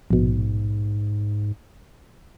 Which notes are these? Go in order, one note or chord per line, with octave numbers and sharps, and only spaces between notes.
A#1 G#2 B2